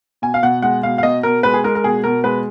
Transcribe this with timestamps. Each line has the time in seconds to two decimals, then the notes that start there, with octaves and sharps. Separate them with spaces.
0.22 B2 G#5
0.34 F5
0.42 B2 F#5
0.62 G#3 F#5
0.83 B2 F5
0.98 F5
1.03 B2 D#5
1.23 B2 A#4
1.43 G#3 B4
1.54 G#4
1.64 G#3 A#4
1.75 A#4
1.84 B2 G#4
2.04 B2 A#4
2.24 G#3 B4